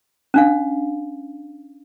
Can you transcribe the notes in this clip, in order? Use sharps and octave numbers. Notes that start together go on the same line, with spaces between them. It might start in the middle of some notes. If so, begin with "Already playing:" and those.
C#4 D4 F5